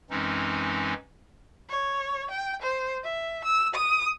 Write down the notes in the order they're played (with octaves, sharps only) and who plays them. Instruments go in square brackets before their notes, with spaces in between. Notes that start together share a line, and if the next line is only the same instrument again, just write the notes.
[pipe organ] F#2 E3 G#3 C4 C#4 D#4
[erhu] C#5
G5
C5
E5
E6
D#6